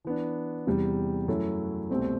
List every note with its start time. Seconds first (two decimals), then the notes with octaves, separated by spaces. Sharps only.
0.05 E3 B3 D4
0.67 E2 C3 E3 G3
1.28 F#2 F#3 A3 E4 A4
1.90 C2 B2 A3 C4 G4